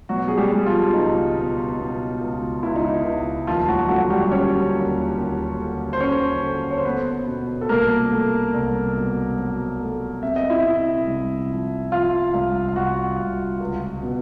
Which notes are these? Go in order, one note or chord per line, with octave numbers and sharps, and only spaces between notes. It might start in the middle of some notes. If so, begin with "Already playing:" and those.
B2 F#3 F#4
G#4
G3 G4
G3
F3 F4
C#2 D#4
B2
B2
C#2
C#2 E4
D#4
E4
C#2
D#2 F3 F4
F#3 F#4
D3 F#3 F#4
G3 G4
D3 C#4 C#5
D#2
D#2
D3
C5
D3 C#4 C#5
D3
C#5
C5
A3 B3 B4
B2
A4
C2 A#3 A#4
A3
C2
B2
F#3
A3
C3 E5
D#5
E4 E5
C3
C2
F3
F3 F4 F5
C2
F5
C2 F#4 F#5
C2
C#2
B2